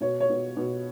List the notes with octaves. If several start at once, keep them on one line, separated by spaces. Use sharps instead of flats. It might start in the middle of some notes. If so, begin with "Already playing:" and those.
B2 C#5
C#5
B2
B2